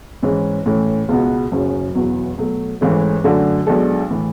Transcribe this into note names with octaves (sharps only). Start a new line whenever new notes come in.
G#2 E3 G#3 C#4
A2 E3 A3 C#4
C#2 B2 G#3 B3 F#4
F#1 F#2 C#3 F#3 C#4
E1 E2 B2 F#3 B3
B2 F#3 A3
A1 G#2 E3 A3 C#4
F#2 D3 A3 D4 F#4
B1 B2 G#3 D4 A4
A2 E3